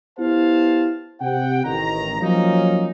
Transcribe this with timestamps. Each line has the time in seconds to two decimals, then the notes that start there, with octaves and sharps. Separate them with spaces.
0.18 B3 E4 G4 C5 F5 A5
1.21 C3 F#5 G5
1.64 A1 D#3 A#5
2.21 F3 F#3 A#3 C#4 D#4